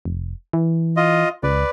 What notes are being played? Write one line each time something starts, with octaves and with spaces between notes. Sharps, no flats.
F1
E3
F4 D#5
C#2 B4 D5